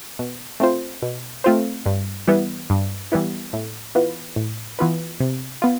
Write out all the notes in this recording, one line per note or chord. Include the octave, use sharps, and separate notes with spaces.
B2
A3 C4 F4 C5
B2
A3 C4 F4 C5
G2
E3 G3 B3 E4
G2
E3 G3 B3 E4
A2
E3 B3 F4 B4
A2
E3 B3 F4 B4
C3
B3 F4